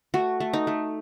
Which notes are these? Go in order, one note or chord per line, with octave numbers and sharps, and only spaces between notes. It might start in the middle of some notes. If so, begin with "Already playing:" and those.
A3 F#4
A3
D#4
A3